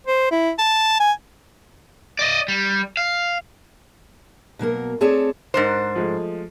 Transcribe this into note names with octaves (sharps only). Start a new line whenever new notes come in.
C5
E4
A5
G#5
D5 D#5
G3
F5
B2 F#3 A#3 A#4
A3 C4 G#4 A4 C#5 D5
G#2 D4 A#4 C5
F3 G#3 A3